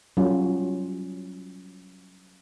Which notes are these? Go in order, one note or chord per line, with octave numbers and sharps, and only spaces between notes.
F#3 G3 C#4 F4